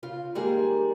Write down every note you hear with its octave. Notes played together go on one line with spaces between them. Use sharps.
C#3 F4 F5
D#3 G3 G#3 A#3 D#4 G#4